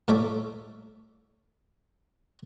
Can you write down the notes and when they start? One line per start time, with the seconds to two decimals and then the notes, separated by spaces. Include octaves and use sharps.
0.08 A2 A3 A4 C#5 E5 D6